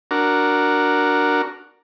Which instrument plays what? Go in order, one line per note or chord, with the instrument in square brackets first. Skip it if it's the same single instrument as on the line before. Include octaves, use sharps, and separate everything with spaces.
[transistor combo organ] D4 F#4 A#4